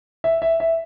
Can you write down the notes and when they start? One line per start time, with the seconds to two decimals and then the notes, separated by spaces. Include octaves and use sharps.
0.24 E5
0.42 E5
0.60 E5